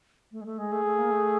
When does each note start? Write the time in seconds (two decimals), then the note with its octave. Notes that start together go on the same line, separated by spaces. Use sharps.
0.32 A3
0.41 G#3
0.46 A3
0.58 G#3 G#4
0.72 A3
0.85 A3
0.98 A#3
1.11 A3